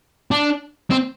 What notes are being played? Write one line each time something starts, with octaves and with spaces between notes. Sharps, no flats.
D4
C4